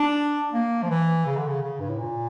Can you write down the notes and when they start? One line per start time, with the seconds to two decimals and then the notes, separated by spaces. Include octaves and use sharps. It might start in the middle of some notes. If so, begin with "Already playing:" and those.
Already playing: D4
0.53 A#3
0.82 F3
0.90 E3
1.26 C#3
1.37 D3
1.47 C#3
1.62 C#3
1.80 G2
1.90 A2
1.98 A#2